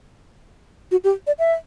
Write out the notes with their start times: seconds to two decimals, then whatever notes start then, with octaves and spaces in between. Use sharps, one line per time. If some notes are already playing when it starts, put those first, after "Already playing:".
0.91 F#4
1.04 G4
1.27 D5
1.39 E5